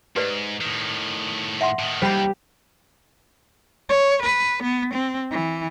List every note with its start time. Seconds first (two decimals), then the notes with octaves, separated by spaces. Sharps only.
0.16 G#2 G4 B4 D5
0.61 A2 D#3
1.61 E5 F#5 C6
1.79 A2 D#3
2.02 D#2 G3 G4 C5 B5
3.90 C#5
4.22 B4
4.63 B3
4.94 C4
5.31 E3